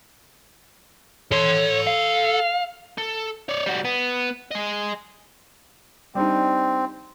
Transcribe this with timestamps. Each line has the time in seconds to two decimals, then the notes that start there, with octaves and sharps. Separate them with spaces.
1.32 A4 C#5 C6
1.87 F5
2.98 A4
3.49 C#5 D5
3.66 G3 F#4
3.85 B3
4.52 G#4 D#5
6.15 G3 C4 D4 D#4